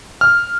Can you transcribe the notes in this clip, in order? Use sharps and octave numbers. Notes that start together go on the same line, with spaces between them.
F6